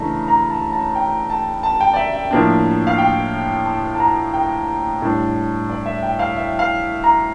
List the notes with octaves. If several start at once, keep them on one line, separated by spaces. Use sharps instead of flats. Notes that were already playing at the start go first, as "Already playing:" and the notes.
Already playing: C#3 E3 A3 D4 A#5
A#5
A5
A5
G5
A5
A5
G5
D5
E5
E5
A2 F3 A#3 D4
F5
G5
A5
A5
A#5
G5
A2 G3 D4
D5
E5
G5
F5
E5
F5
A#5